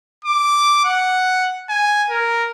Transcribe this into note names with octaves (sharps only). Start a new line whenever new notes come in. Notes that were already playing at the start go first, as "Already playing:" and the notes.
D6
F#5
G#5
A#4